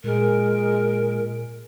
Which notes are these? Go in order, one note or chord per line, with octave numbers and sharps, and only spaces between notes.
A#2 G#3 A#4